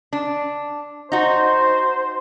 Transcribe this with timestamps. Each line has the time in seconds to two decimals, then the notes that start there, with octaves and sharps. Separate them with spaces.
0.13 D4
1.12 D#4 F#4 C5